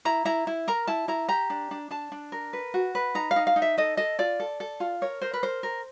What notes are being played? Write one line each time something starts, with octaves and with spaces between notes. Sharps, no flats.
E4 A#5
E4 A#5
E4
A#4 A#5
E4 A5
E4 A#5
G4 A#5
D4
D4
D4 A5
D4
A#4
B4
F#4
B4
D#4 A#5
F5
D#4
F5
D#4
E5
A4 D#5
A4 D#5
F4 D5
A4
A4
F4
A#4 C#5
A#4 C5
B4
A#4 C5
A#4